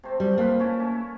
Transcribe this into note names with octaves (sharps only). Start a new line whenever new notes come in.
C3 A3 C4
G3
A#3 F4 A4 B4
A3 C#4 E4
C#4